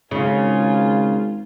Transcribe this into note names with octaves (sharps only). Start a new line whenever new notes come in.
G#1 C#3 F4 G#5